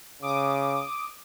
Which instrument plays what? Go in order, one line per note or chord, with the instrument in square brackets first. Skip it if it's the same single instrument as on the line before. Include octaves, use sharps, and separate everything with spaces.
[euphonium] C#3 [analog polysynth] D6 D#6